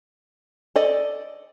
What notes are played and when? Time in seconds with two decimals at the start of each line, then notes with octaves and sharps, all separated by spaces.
0.76 A4 D5 D#5